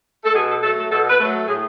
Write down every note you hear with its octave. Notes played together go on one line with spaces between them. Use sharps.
A4
B2 G#4
A4
F#3 A3 A4
A4
B2 A4
B4
F#3 A3
A2 G#4